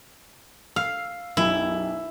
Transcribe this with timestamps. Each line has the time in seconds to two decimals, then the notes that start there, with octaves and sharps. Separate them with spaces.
0.76 F5 E6 C7
1.37 B1 F#2 E4 G4